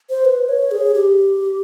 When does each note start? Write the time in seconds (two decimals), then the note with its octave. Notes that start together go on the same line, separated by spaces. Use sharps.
0.10 C5
0.25 B4
0.49 C#5
0.71 G#4
0.94 G4